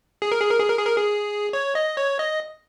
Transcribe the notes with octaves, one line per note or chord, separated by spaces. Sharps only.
G#4
A#4
G#4
A#4
G#4
A#4
G#4
A#4
G#4
C#5
D#5
C#5
D#5